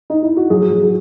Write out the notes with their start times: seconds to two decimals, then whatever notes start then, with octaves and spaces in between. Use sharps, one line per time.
0.10 D#4
0.23 E4
0.37 F#4
0.50 F#3 G#4
0.70 F#3
0.82 G#4